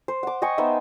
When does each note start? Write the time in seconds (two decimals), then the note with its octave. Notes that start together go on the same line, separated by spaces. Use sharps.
0.08 C5
0.23 F#5 D6
0.42 D#5 G5 G#5 C#6
0.58 B3 D#4 C5 E5